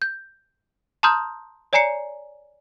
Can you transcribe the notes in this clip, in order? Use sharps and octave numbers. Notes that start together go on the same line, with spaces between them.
G6
A5 A#5 C6 D#6 F6 G6
C#5 D5 G#5 A#5 C7 C#7